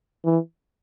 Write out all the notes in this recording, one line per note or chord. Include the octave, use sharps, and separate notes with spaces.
E3